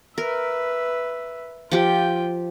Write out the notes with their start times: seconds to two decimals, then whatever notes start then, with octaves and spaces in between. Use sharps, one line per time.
0.18 A#4 B4 E5
1.72 F3 F4 G4 G5